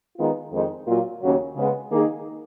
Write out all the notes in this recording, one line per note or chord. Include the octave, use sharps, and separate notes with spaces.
D#3 G#3 B3 F4
F2 D#3 G#3 D#4
A#2 F#3 A#3 F4
D#2 C#3 F#3
C#3 G#3 B3
D#3 A#3 D#4 G#4